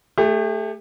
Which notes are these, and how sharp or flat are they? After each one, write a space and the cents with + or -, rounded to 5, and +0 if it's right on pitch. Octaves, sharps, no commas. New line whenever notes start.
A3 +0 G4 +40